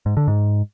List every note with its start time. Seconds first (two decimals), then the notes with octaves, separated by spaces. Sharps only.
0.06 G#2
0.17 D3
0.28 G#2